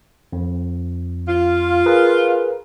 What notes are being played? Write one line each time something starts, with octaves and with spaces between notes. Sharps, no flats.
F2
F4
G#4 A#4 B4